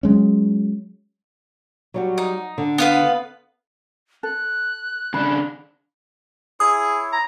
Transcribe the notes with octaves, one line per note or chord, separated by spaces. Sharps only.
F#3 G#3 C#4
F#3 G3 F#4
D#4
D3
B3 F4 B4
A4 F#6
C#3 D4 B5
E4 G#4 C#5 D#6
A#5